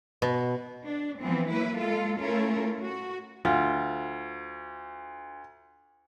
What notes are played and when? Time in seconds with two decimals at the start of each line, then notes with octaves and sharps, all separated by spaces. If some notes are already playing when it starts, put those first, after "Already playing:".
0.22 B2
0.85 D4
1.21 E3 F3 B3 C4
1.50 F#3 A#3 E4 B4
1.78 G#3 F4 A4
2.18 A3 C#4 E4 F4 A4 A#4
2.83 F#4
3.45 D2 F4